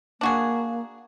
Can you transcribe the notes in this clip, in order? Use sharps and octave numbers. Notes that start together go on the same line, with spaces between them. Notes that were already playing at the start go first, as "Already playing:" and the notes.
A#3 D4 F#4 G#4